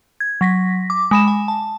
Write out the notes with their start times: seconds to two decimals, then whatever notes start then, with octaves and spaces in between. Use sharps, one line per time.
0.20 G#6
0.41 F#3 A#6 B6
0.90 D6
1.11 G#3 B5 E7
1.27 G#5
1.48 A5